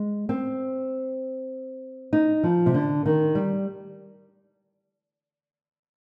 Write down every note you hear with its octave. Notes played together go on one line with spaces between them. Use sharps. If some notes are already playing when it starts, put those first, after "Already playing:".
Already playing: G#3
C4
D#4
F3
C3
D3
D#3
G3